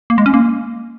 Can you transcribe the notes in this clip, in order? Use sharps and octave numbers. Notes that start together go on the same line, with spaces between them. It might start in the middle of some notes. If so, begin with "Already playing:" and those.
A#3
G#3
C#4
A#3